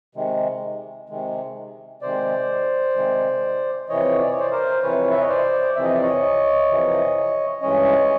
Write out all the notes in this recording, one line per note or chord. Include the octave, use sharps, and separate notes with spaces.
C3 D#3 G#3
C3 D#3 G#3
C3 D#3 G#3 C5 D5
C3 D#3 G#3
F2 C3 E3 C#5 D#5
D5
C#5
C5 D5
A#4 C5
F2 C3 E3 B4 C#5
E5
D#5
C5 D5
F2 C3 E3 E5
D#5
D5
C#5 D#5
F2 C3 E3
G2 E3 G#3 C#4 C#5 D#5